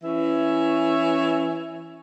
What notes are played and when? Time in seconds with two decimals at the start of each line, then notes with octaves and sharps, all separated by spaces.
0.03 E3 C#4 E5